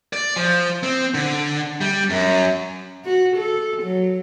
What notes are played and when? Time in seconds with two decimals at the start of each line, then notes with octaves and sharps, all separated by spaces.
0.13 D5
0.36 F3
0.83 C4
1.14 D3
1.81 G3
2.10 F#2
3.05 F#4
3.37 A4
3.83 F#3